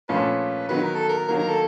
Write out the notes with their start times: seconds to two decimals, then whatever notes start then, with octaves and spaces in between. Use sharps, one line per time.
0.09 A#2 F3 A3 C#4 F4 B4
0.69 D#3 F#3 B3 B4
0.83 A#4
0.95 A4
1.09 A#4
1.28 D#3 F#3 A#3 A#4
1.39 A#4
1.49 A4